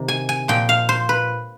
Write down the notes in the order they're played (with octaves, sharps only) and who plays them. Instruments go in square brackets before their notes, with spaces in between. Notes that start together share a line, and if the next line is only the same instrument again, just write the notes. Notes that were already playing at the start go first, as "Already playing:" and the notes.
Already playing: [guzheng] C3 D#3
G#5
G#5
A#2 F3 G5
F5
C5
B4